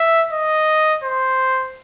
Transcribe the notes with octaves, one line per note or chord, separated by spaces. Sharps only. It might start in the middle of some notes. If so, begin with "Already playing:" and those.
Already playing: E5
D#5
C5